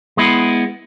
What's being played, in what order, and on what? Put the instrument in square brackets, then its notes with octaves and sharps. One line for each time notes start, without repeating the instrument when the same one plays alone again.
[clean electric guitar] G#3 B3 E4